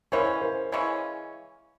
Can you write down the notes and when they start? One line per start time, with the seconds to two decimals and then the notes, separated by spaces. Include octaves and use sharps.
0.12 C#3 E3 G#3 C#4 A#4 C5
0.41 A#4 C5
0.72 C#3 E3 G#3 C#4